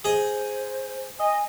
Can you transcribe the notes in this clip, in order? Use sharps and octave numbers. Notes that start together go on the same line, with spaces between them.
G#4 C5 D#5
D#5 G#5